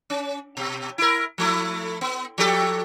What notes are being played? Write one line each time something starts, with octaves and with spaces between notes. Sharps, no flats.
C#4
B2
E4 A#4
F3 A3 E4
B3
F3 G4 A4